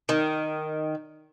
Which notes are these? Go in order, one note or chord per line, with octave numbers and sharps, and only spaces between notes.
D#3